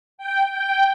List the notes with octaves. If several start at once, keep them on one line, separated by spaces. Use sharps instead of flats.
G5
G5